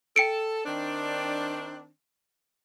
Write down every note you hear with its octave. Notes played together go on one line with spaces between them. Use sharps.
A4 G5 C#7 D7
D#3 C4 D4